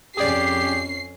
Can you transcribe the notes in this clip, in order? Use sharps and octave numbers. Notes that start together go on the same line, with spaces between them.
F2 C#4 G4 G#4 D5 C7